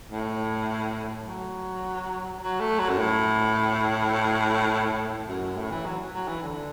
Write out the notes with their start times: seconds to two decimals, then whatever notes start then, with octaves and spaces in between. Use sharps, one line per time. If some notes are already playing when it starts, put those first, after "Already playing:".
0.11 A2
1.26 F#3
2.41 F#3
2.60 A3
2.79 F#3
2.89 F#2
2.98 A2
5.28 F#2
5.42 F#2
5.57 A2
5.71 E3
5.85 F#3
6.14 F#3
6.28 E3
6.43 D3